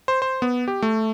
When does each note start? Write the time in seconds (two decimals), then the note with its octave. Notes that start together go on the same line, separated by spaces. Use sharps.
0.08 C5
0.22 C5
0.42 B3
0.68 G4
0.82 A3